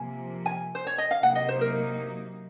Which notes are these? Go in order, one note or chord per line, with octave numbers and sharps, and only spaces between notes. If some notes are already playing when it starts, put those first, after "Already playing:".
Already playing: C3 F3 A#3 G#5
G#5
C5
C#5
D#5
F5
C3 F#3 A#3 D#4 F#5
D#5
C5
A#4